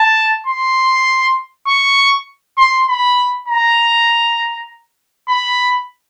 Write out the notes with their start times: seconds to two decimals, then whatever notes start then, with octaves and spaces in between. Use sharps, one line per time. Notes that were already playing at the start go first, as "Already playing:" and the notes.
Already playing: A5
0.46 C6
1.67 C#6
2.58 C6
2.88 B5
3.48 A#5
5.28 B5